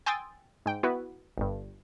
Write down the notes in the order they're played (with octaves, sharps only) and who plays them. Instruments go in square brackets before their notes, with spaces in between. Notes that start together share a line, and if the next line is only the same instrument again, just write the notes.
[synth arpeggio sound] G5 G#5 C6 D#6 E6 A6
G#2 G5
B3 E4 F#4 B4
G1 G2